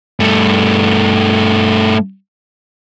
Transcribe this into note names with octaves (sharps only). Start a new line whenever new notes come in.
G2 A3